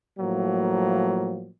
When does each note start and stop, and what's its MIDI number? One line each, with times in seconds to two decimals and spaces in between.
0.18 1.50 45
0.18 1.50 53
0.18 1.50 54
0.18 1.50 58